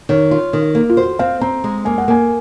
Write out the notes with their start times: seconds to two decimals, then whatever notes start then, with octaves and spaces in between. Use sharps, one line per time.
0.09 D#3 C#5
0.31 F4
0.53 D#3
0.75 A#3
0.90 F4
0.97 F#4 C5
1.19 C4 F5
1.41 C4 A#5
1.64 G#3
1.85 A#3 G#5
1.98 F#5
2.08 A#3 G#5